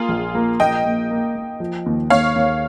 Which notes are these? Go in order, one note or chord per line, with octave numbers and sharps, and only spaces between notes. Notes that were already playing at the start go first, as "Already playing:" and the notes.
Already playing: A#3 F4 G#4
A#1
A#3
A#1 D#5 G5
A#3
A#3
A#3
F3
D#2
D#2 C#5 F5
D#2